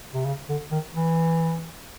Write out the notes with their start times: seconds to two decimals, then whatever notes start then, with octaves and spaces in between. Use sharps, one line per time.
0.14 C3
0.25 C#3
0.49 D3
0.72 D#3
0.96 E3